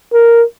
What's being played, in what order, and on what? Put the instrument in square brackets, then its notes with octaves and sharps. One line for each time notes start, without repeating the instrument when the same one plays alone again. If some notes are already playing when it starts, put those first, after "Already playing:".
[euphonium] A#4